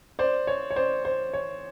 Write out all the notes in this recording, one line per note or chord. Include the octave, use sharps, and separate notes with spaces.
C5 D5
C#5
C#5
C5 D5
C5
C#5